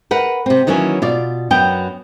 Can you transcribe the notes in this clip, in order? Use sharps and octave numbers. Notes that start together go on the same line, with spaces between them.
A#4 B4 F#5
C3 C4
D#3 E3 F#3 A#3 C#4
B2 F4 D5
F#2 F#3 B3 G5